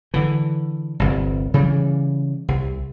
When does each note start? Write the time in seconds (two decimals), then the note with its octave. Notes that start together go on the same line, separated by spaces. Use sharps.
0.14 D3 E3
1.00 G1 C2
1.54 C#3 E3 G3
2.48 C2